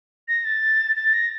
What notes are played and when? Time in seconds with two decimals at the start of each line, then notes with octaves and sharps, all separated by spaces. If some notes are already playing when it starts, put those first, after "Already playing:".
0.28 A#6
0.45 A6
0.96 A6
1.13 A#6